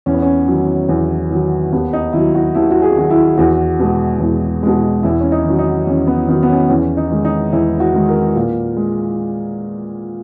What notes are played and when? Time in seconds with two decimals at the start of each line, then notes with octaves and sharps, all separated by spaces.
0.06 E2 C#4
0.14 B3
0.22 C#4
0.48 D#3 F#3
0.89 E2
1.31 D#3 F#3
1.72 D#2 B3
1.93 D#4
2.13 D#3 F#3 E4
2.35 F#4
2.54 D#2 E4
2.71 F#4
2.82 G#4
2.97 D#3 F#3 F#4
3.10 E4
3.38 E2 F#4
3.79 B2 G#3
4.20 E2
4.63 B2 G#3
5.03 E2 E4
5.20 C#4
5.32 D#4
5.45 D#3 F#3
5.59 D#4
5.87 E2 C#4
6.07 B3
6.28 D#3 F#3 B3
6.43 B3
6.50 C#4
6.69 E2 C#4
6.97 D#4
7.11 D#3 G#3
7.25 D#4
7.52 E2 E4
7.80 F#4
7.93 D#3 G#3
8.08 A#4
8.35 A#2
8.77 G#3